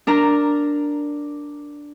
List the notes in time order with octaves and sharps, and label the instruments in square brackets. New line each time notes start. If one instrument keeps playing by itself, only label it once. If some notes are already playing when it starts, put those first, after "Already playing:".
[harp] D4 A#4 A#5